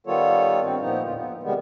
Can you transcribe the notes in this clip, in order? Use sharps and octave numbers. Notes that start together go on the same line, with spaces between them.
D#3 G3 B3 F4 A4 C#5
G2 C4
A#2 F3 B3 D#4
E2 A2 D3 F4
B3
C3 D#3 G3 G#3 B3